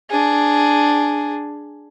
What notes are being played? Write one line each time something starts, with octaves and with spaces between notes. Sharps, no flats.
D4 G#4